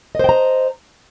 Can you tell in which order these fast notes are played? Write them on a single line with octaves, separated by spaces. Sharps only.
D#5 C5 G5 A#5